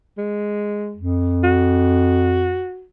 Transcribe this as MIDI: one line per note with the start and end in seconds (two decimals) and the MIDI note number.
0.17 0.98 56
0.96 2.64 41
1.43 2.85 66